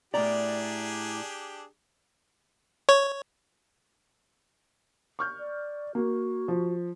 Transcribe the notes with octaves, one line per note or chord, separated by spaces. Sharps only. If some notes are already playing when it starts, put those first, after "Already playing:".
A2 D4 G4 G#4 D5 A#5
C#5
C#6 F6 G6
D5
A#3 F#4
F3